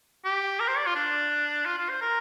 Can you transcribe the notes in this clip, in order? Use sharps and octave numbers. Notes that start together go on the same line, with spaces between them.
G4
A#4
C5
D5
F4
D4
F4
F4
C5
A#4